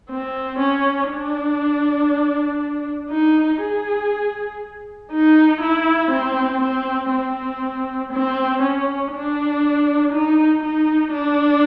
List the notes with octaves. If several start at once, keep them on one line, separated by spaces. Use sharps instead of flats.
C4
C#4
D4
D#4
G#4
D#4
E4
C4
C4
C4
C4
C#4
D4
D#4
D#4
D4